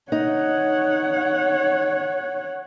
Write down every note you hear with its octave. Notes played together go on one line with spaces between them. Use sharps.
D#4 C#5 F#5